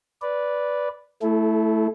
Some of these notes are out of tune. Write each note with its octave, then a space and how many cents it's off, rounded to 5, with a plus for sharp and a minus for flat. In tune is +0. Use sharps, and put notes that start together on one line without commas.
B4 -5 D5 -10
A3 +0 E4 +0 A4 -35